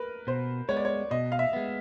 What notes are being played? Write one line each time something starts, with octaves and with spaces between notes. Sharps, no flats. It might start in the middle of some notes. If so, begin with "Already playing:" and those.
Already playing: A#4 B4
B2 C5
G#3 B3 C#5
D5
C#5
B2 D#5
F5
E5
G#3 B3